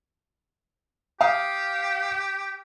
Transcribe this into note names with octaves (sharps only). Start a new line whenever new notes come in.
G4 F5 D#6